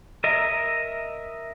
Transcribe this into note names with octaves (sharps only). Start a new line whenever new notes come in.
A#4 D#5 E5 A#5